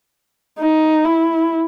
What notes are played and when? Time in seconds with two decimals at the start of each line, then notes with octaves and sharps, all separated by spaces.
0.59 D#4
1.04 E4